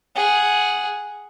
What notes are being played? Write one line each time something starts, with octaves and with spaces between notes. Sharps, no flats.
G#4 F#5